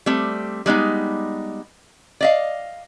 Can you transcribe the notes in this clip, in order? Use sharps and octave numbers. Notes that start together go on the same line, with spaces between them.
G3 A3 C4
G3 G#3 B3 D#4
D5 D#5 F5